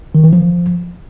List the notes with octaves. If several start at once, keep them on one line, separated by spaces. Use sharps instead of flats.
D#3
E3
F3